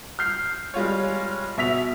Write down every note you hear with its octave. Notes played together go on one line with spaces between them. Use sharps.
F6 G6 C7
G3 G#3 F4 C#5
B2 E5 B6 F7